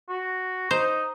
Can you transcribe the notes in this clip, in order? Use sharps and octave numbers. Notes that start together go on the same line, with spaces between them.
F#4
D#4 C5